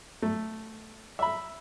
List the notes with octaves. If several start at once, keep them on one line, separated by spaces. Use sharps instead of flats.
A3
E5 B5